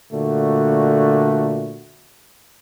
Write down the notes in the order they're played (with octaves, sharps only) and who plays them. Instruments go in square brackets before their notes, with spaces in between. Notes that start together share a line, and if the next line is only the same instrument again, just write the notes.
[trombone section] A#2 D3 A3 F#4